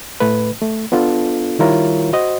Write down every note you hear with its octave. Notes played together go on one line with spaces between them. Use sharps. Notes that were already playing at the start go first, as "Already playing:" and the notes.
A2 A3 B4
A3
B3 D4 F4 A4
D#3 G3 E4 F4 A#4 C#5
F#4 C5 D#5